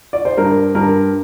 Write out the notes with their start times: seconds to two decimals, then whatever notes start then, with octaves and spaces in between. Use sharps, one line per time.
0.13 D5
0.25 C5
0.38 G2 A#4
0.75 G2 A#4